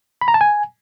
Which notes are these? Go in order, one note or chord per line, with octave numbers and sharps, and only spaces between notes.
B5
A#5
A5
G#5